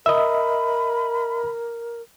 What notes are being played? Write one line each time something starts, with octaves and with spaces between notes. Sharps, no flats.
A#4 D#5 E5 B5